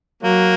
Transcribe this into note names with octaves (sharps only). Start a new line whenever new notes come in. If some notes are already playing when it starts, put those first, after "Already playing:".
F#3 A#3